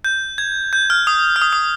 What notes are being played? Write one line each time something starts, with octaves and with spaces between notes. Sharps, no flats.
G6
G#6
G6
F6
D#6
F6
D#6
D#6